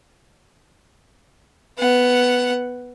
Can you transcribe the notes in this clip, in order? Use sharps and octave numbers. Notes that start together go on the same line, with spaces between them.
B3 F#5